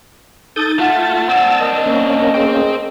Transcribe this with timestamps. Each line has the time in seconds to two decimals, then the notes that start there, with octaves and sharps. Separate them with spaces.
0.56 D#4 A4 D#6 G6 A6
0.79 A3 F4 F#5 A5
1.29 C4 D4 A5 E6
1.60 A#4 D#5
1.86 A#3 C#4 A#4
2.34 G#4 C5 G5